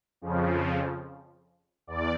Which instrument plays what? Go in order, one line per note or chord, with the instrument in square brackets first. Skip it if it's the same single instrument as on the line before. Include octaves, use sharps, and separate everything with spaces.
[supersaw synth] F2 C#3 F3
E2 D5